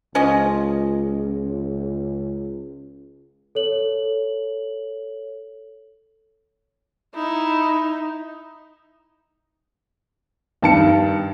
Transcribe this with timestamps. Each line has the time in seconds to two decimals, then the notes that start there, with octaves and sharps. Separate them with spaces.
0.15 C#2 F3 C#4 D#5
3.55 A4 C#5 F#7
7.15 D#4 E4
10.62 G2 D#3 A5 C#7